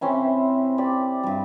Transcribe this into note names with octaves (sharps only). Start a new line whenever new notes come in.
C3 C4 C#4 E4
G4 D5
G2 G3